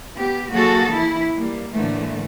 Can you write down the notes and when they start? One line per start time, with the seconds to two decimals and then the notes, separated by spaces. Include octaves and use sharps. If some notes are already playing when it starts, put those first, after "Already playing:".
0.16 B3 G4
0.52 F#3 A#3 F#4 G#4 A4
0.91 E3 E4
1.36 G3 A#3
1.74 A2 D3 E3 A3 A#3